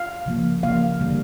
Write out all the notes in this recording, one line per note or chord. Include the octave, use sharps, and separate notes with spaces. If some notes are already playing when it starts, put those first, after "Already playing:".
Already playing: F5
C#3 F3 A#3
C#3 F3 A#3 F5
D3 G3 A#3